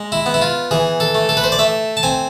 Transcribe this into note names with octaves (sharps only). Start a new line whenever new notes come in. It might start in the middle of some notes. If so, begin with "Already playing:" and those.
Already playing: G#3
E4
B3
E4
F4
E3 G#4
A4
A3
A4
B4
C5
D5
A3 E5
A5
C4 G#5